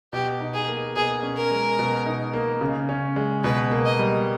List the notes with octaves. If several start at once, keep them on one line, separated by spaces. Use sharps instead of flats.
B2 G4
D#4
G#4
A#3
B2 G#4
C#4
A#4
G#3
B2
D#4
A#3
C#3
C#4
G#3
B2 B4
A#3
D#5
G3